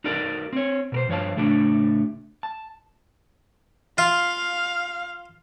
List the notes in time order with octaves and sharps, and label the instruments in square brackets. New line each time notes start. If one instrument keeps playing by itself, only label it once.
[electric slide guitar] D#4 F#4 A4 A#4 D5
C4 C#5
B2 A#4 C5
G2 F3 C#5 F5 A5
A2 C#3 A3 D4 F#4
A5
[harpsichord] F4 [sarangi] F5